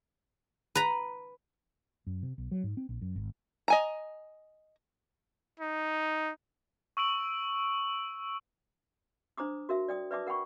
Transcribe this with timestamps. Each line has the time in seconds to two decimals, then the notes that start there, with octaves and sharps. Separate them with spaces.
0.75 B4 A#5
2.07 F#2
2.23 C3
2.38 B1
2.52 F#3
2.64 G#2
2.77 C4
2.89 A#1
3.01 F#2
3.16 G#1
3.68 D#5 G#5 A#5
5.60 D#4
6.97 C#6 E6 D7 F#7
9.38 D4 C5 A#5 D6 D#6
9.69 F#4 A#4 E5
9.88 D5 G5 D#6
10.11 B4 D5 E5 A5 D6 D#6
10.26 A#4 F#5 G5 B5 C#6